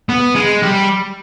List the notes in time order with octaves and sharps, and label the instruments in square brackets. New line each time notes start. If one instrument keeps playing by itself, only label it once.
[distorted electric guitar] B3
G#3
G3